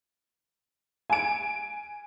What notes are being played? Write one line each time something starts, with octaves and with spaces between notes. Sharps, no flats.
G#5 D7